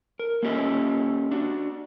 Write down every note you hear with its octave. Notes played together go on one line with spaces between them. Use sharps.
A#4
A#3 C#4 G4 D#5 E5
D4 F#4